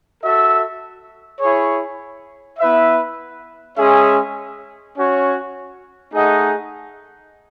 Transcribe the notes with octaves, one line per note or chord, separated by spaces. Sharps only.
F#4 A4 E5
E4 G#4 C#5
B3 E4 B4 E5
G#3 C#4 G#4 C#5 E5
C#4 F#4 C#5
A3 D#4 G#4 D#5 F#5